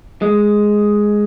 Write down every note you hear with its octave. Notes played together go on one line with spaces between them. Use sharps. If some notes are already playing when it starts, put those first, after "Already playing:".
G#3